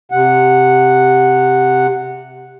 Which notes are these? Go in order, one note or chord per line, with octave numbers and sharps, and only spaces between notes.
C3 F#5